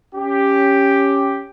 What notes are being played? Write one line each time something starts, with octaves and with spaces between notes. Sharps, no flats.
C#4 G4